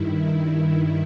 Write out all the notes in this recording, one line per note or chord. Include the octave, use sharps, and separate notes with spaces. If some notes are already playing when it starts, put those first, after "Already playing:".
Already playing: G2 D#3 E4